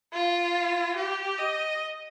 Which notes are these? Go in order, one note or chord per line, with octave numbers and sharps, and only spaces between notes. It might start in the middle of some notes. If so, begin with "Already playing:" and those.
F4
G4
D#5